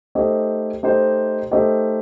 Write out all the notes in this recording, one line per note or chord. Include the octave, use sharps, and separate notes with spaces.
A3 D#4 G4 C5 D#5
A3 D#4 G4 C5 D#5
A3 D#4 G4 C5 D#5